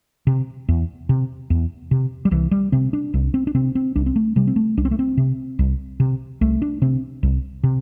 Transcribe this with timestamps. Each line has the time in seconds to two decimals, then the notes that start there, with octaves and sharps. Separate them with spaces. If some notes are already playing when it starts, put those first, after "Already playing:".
0.27 C3
0.68 E2
1.09 C3
1.50 E2
1.91 C3
2.25 G3
2.31 C2 E3
2.51 G3
2.72 C3 C4
2.93 D4
3.14 C2
3.34 C4
3.47 D4
3.55 C3 C4
3.75 C4
3.96 C2 D4
4.06 C4
4.16 A3
4.36 C3 G3
4.47 C4
4.56 A3
4.77 C2 D4
4.85 C4
4.91 A3
4.99 C4
5.17 C3
5.59 C2
6.00 C3
6.41 C2 A3
6.62 D4
6.82 C3 C4
7.23 C2
7.63 C3